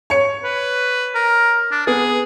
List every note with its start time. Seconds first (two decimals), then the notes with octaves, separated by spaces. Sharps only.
0.10 C#5 C#7
0.44 B4
1.15 A#4
1.72 D4
1.87 B3 G#4